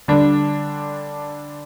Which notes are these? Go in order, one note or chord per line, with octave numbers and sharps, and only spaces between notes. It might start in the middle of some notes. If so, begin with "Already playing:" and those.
D3 G3 D4